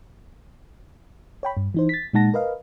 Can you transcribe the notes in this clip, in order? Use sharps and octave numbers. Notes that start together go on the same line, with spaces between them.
C#5 G5 B5
G2
E3 D#4 C5
A6 B6
A#2 G#3 D#4 F#5 A5 A#6
A#4 B4 D#5 F5